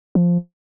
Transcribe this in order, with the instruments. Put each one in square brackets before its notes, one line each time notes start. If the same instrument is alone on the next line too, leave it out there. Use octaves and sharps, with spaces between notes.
[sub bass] F3